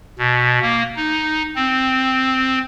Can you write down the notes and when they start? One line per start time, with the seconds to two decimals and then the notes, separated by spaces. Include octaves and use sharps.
0.19 B2
0.62 A#3
0.97 D#4
1.56 C4